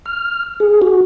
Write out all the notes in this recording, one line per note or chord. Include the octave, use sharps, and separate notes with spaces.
F6
G#4
F#4